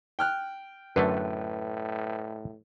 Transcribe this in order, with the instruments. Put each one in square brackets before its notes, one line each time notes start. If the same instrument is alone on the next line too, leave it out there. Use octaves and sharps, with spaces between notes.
[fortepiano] G5 F6 F#6
[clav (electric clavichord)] F#2 D3 A3 [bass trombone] A2 [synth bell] B4